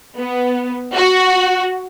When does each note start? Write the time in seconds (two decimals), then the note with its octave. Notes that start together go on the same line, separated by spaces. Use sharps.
0.18 B3
0.96 F#4